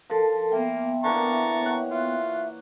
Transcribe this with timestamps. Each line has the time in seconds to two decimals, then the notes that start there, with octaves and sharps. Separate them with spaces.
0.10 F3 A4 A#4 A5
0.52 A#3 B3 E5 G5
1.04 D3 E3 A#3 A5 A#5 C#6
1.61 C#5 F#5
1.91 F4 E5